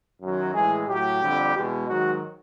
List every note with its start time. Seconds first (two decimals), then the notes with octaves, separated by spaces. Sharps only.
0.21 F#2 D#3 F#3
0.54 A2 E3 G#3 G#4
0.87 A2 F#3 G4
1.21 F2 D3 G3
1.54 E2 B2 G#3
1.88 G#2 D#3 F#3 F#4